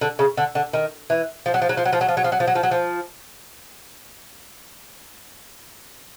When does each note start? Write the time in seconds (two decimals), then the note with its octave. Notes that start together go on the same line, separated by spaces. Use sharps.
0.01 D3
0.19 C#3
0.37 D3
0.55 D3
0.73 D#3
1.10 E3
1.46 F3
1.54 F#3
1.62 F3
1.69 F#3
1.77 F3
1.85 F#3
1.93 F3
2.01 F#3
2.08 F3
2.17 F#3
2.24 F3
2.32 F#3
2.40 F3
2.47 F#3
2.55 F3
2.63 F#3
2.71 F3